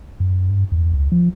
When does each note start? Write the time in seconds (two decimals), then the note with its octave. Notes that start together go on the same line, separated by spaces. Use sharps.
0.20 F#2
0.49 G2
0.72 E2
0.93 C#2
1.12 F3